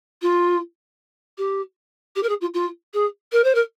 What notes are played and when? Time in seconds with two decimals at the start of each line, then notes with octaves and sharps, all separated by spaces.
0.22 F4
1.38 G4
2.16 G4
2.23 A#4
2.29 G#4
2.41 F4
2.54 F4
2.94 G#4
3.32 A#4
3.44 C5
3.55 A#4